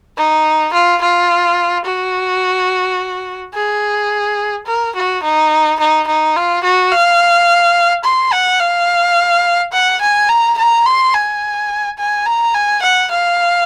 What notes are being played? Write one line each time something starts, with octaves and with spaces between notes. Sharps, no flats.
D#4
F4
F4
F#4
G#4
A#4
F#4
D#4
D#4
D#4
F4
F#4
F5
C6
F#5
F5
F#5
G#5
A#5
A#5
C6
G#5
G#5
A#5
G#5
F#5
F5